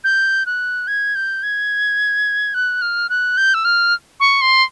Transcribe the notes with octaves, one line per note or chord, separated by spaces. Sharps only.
G6
F#6
G#6
G6
G#6
F#6
F6
F#6
G6
E6
F6
C#6
C6